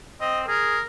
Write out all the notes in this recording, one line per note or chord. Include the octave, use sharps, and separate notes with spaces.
C4 D#5
G#4 A#4